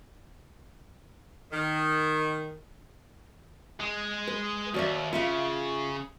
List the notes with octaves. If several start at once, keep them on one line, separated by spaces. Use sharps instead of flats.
D#3
G#3
B4
D#2 F#4 D5 E5
C#3 F4 E5 F5